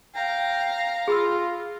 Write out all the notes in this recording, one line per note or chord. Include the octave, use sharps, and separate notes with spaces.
F5 G5 A#5
F4 G#4 B5 E6